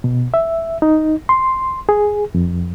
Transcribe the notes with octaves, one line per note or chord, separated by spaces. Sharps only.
B2
E5
D#4
C6
G#4
F2